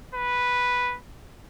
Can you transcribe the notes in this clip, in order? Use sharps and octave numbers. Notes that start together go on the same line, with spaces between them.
B4